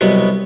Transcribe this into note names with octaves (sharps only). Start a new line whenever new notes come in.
C2 B2 F#3 B3